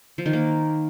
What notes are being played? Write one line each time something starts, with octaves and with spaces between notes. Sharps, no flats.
F3
D#3
A#3